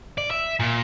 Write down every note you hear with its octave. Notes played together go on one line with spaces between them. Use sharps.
D5
E5
A#2